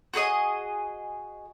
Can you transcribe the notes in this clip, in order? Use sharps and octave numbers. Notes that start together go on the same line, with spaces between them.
F#4 G#4 A4 D#5